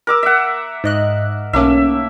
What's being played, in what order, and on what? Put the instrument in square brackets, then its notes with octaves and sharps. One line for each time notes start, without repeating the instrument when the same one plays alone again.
[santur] A#4 D6 E6
E5 F#5
[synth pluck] G#2 D#5 F#6
[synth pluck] B1 C#4 [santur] A3 A#3 E5